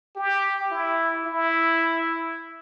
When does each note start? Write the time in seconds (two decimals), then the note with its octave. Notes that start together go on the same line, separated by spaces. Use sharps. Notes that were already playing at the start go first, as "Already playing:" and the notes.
0.16 G4
0.71 E4
1.26 E4